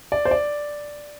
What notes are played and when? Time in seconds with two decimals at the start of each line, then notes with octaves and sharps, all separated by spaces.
0.12 D5
0.25 C5
0.31 D5